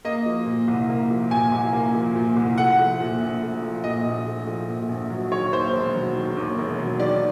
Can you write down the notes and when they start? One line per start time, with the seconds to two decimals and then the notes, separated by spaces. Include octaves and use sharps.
0.05 A#3 D#5
0.26 F3
0.46 A#2
0.68 C2
0.89 A#3
1.10 F3
1.31 A#2 G#5
1.52 C2
1.73 A#3
1.94 F3
2.15 A#2
2.37 C2
2.58 A3 F#5
2.79 F3
3.00 A#2
3.21 A#1
3.42 A3
3.62 F3
3.84 A#2 D#5
4.05 A#1
4.26 A3
4.47 F3
4.69 A#2
4.89 A#1
5.10 F#3
5.31 D#3 C#5
5.53 D#2 C5
5.73 E1
5.95 F#3
6.16 D#3
6.37 D#2
6.58 E1
6.78 F#3
7.00 D#3 D5